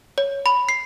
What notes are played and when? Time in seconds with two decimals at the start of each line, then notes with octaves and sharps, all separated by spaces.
0.18 C#5
0.46 B5
0.69 C7